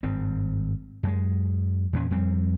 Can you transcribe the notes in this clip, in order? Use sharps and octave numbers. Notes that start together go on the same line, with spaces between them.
G#1 G2 C4
F#2 G#3
E2 A#2 C#4
F2 G3 C4